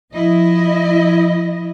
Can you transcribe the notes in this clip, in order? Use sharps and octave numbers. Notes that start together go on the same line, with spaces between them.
F3 E4 D#5